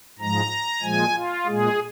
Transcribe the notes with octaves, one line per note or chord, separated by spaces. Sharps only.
G#2 F3 G#3 A#5
A#2 F3 G#3 G#5
F4
A#2 G#3 G#4